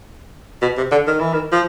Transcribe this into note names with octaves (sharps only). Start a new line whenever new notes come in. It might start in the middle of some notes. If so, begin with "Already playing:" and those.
B2
C3
D3
D#3
E3
D#3
F3